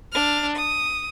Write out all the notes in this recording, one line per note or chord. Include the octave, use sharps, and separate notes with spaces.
D4 F6
D#6